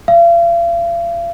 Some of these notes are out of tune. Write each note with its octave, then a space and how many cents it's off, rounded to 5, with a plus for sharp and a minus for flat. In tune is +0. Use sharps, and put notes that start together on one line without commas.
F5 -40